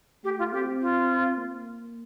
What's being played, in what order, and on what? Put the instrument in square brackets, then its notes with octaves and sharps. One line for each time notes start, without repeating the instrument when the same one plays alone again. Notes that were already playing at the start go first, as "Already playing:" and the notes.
[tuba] A3 [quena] G4
[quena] F4
[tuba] C4 [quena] G4
[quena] F4
[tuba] A#3